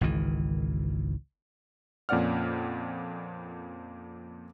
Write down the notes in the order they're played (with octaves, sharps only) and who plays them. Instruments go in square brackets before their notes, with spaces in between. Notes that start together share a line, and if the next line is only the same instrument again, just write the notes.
[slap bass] G#1 C#2 D#3 E3
[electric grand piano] F2 A#2 C#4 D5 F#5 F6